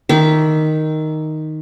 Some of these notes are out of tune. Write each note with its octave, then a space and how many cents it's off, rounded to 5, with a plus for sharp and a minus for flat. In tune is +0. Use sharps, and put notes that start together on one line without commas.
D#3 +0 E5 +0 D6 -40